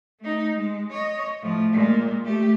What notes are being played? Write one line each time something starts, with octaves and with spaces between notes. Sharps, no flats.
A3 D#4
G#3
C#5 D#5
A2 F3
A#2 G#3
A3 G4